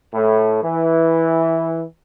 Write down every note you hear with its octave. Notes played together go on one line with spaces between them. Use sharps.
A2
E3